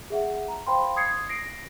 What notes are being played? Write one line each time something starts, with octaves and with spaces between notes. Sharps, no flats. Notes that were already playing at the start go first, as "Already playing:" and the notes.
G#4 E5 F#5
A#5
C5 F5 G5 B5 C6
D#6 G#6 C7 C#7
A#6 C7 D7